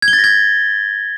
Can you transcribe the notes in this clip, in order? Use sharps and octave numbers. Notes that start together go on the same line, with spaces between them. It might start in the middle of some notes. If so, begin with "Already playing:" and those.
G#6
G7
A6
A#6
G#6